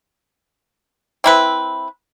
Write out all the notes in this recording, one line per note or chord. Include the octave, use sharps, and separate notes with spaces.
C4 E4 B4